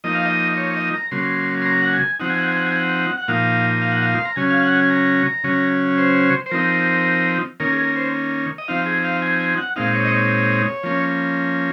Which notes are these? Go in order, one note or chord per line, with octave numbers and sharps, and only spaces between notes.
F3 A#3 D#4 D#5
F5
D#5
C#5
D#5
A#5
C#3 F#3 A#3 C6
C6
A#5
F#5
G#5
F3 C4 D#4 F#5
G#5
F#5
G#5
F#5
G#5
F#5
F#5
A#2 F3 A#3 D#4 F5
F5
F#5
F5
C6
A#5
C#3 F#3 C#4 G#5
F5
F#5
G#5
A#5
C#3 F#3 C#4
C5
C5
F3 C4 D#4 A#4
D#3 A#3 C#4 A#4
G#4
A#4
C5
D#5
F3 C4 D#4 F5
G#4
F5
G#5
G#5
F#5
A#2 G#3 C4 D#4 F5
C#5
D#5
C#5
F3 A#3 C#4